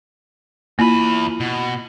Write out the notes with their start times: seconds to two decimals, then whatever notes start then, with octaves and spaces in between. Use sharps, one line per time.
0.79 E2 A#3 E4 F4 B5 D#7
1.40 B2